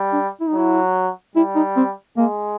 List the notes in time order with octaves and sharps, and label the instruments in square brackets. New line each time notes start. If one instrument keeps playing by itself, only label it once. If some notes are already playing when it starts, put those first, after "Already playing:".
Already playing: [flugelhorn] G3
[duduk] D4
E4
D#4
[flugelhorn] F#3 [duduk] E4
[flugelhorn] G3 [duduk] E4
[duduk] D#4
C4
[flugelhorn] G#3 [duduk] A#3